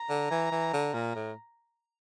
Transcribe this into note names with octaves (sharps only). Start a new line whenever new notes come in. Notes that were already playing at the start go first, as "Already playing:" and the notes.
Already playing: A#5
D3
E3
E3
D3
A#2
A2